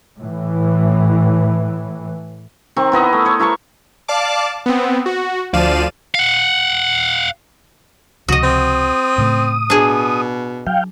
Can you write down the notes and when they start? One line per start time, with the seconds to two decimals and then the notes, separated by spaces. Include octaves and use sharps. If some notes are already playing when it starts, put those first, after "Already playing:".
0.20 A2 E3
2.76 D#3 C4 C#6
2.92 B3 E4 D#5 E5
3.13 A3
3.25 C5 C#5 A5
3.39 E4 A#4 A5 C#6
4.08 D5 F5 A5 D6
4.66 B3 C4
5.06 F#4
5.53 D2 F3 D5 F5 D#7 E7
6.15 F5 F#5
8.28 C#2 C3 F3 F#4 D#5 D#6
8.43 C4
9.18 A2 C#3 A3
9.70 B2 D4 G#4
10.67 F#3 F5 G5